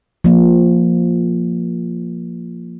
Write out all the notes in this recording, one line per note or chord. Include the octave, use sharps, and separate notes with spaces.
F3 A#3